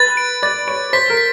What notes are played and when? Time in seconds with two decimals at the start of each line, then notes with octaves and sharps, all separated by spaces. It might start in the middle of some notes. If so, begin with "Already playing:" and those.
Already playing: B4 A6
0.17 D7
0.43 D5 A6
0.68 C#5 D7
0.93 C5 B6
1.10 A#4
1.17 B6